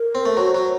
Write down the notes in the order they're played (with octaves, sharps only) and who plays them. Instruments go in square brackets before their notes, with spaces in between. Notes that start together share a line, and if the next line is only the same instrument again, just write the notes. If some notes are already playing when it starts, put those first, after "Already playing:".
Already playing: [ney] A#4
[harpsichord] C4
A3
[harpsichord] F#3 [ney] C5
[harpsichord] F#3